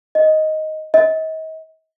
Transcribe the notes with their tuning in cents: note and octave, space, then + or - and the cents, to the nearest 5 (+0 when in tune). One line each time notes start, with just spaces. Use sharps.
D#5 +5
D#5 +40